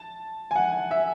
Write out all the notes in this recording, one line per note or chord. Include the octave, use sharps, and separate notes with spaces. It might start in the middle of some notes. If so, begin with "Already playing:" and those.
Already playing: A5
G#5
F#5
E5